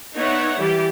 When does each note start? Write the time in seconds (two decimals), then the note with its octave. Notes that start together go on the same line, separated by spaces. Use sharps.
0.15 B3 D#4 C#5 D5 E5 F#5
0.58 E3 G3 G4 D5